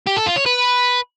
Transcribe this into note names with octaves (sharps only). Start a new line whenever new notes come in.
G4
A4
F4
C#5
B4